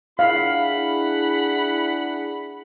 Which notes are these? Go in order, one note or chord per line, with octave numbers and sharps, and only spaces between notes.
D4 E4 G#4 F5 F#5 B5